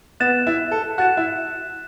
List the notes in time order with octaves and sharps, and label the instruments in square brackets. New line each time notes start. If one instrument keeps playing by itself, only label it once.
[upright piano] B3 [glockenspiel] F#6 A6 E7
[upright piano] E4
A4
[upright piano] F#4 [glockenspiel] F#6 A6 E7
[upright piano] E4